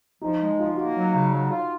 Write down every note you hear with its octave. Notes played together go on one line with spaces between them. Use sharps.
F3 D#4
G#3
F3 F4
A#3 F#4
F#3
C#3
F#3
F4